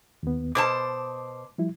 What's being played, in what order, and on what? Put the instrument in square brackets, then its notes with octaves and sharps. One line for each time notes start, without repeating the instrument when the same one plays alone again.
[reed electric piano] D#2 B3
[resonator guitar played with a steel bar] B2 C5 A5 [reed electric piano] D6
[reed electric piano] F3 G3 E4